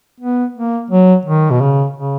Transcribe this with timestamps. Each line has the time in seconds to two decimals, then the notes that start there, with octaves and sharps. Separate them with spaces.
0.20 B3
0.55 A#3
0.90 F#3
1.25 D#3
1.50 B2
1.61 C#3
1.96 C#3